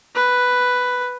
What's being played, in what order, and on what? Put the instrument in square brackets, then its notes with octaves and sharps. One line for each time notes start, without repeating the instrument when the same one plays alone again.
[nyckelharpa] B4